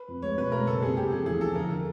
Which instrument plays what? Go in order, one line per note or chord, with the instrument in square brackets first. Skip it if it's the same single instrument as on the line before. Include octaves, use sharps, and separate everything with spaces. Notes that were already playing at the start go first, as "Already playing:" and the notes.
Already playing: [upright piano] B4
[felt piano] F2
[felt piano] G#3 [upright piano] C#5
[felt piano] B2 [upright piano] B4
[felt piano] G#3 [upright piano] A#4
[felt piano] F#1 [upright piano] A4
[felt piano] C3 [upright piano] G#4
[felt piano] C3 [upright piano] G4
[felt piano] F3 [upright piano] G#4
[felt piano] E2 [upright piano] G#4
[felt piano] F3 [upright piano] A4
[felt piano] D3 [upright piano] A#4